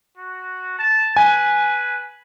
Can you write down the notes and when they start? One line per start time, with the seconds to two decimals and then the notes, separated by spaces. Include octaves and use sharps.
0.17 F#4
0.79 A5
1.16 B4 G#5